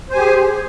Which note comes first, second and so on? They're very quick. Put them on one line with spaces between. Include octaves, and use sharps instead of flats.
C5 G#5 G4 G#4